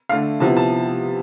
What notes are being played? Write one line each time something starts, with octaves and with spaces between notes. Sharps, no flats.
D3 A3 D4 F5
C3 F3 B3 E4 A5
A5